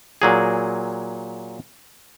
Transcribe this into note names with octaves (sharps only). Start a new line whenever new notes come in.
A#2 F#3 G#4